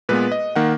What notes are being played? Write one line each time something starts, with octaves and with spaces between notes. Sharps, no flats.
A#2 G#3 B3 B4
D#5
D#3 A#3 F#5